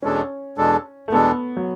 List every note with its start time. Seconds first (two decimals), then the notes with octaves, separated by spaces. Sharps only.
0.02 E2 B2 G#3 C#4 D4 A4
0.57 E2 B2 G#3 D4 A4
1.08 A3
1.12 E2 B2 G#3 B3 D4 A4
1.57 F#3